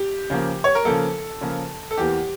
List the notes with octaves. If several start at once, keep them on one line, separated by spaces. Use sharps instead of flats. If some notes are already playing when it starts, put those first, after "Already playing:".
Already playing: G4
C#3 F3 A#3
C#5
A#4
C#3 F3 A#3 A4
C#3 F3 A#3
A4
E2 E3 A#3 G4